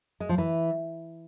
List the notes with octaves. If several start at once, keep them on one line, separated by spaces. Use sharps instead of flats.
G#3
F3
E3